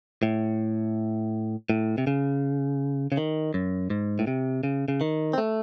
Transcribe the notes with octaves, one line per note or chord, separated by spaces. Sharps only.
A2
A2
C3
C#3
C#3
D#3
F#2
G#2
A2
C3
C#3
C#3
D#3
C4
A3